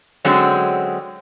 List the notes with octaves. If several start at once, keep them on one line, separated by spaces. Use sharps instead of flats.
D3 F#3 G#3 C4 C#4 F#4